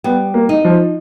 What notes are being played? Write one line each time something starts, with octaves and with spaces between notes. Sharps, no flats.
G3 B3
A#3
D#4
F3